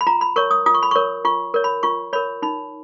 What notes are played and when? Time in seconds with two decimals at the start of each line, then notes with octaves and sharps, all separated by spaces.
0.01 B5
0.07 F4 A#5
0.21 B5
0.36 A#4 C#5 C#6
0.51 D#6
0.66 F4 D#6
0.74 C#6
0.83 B5
0.91 A#4 C#5 C#6
1.25 F4 C#6
1.54 A#4 C#5
1.64 B5
1.83 F4 C#6
2.13 A#4 C#5 B5
2.42 D#4 B5